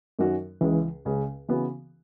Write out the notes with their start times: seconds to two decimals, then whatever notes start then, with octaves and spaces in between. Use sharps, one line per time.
0.19 F#2 D#3 F#3 C#4 F#4
0.61 C#2 C#3 E3 G#3
1.05 C#2 C#3 G#3
1.48 C#3 E3 B3 F#4